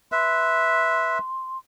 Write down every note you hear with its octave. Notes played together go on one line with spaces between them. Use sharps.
B4 E5 C6